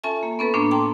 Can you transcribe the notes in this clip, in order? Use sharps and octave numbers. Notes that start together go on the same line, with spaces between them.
C#4 F4 A4 E5 G#5 A5
A#3
B3 C#4 A4 B4
A2 A#3 B3 D4
G5 A5 A#5 C6 D6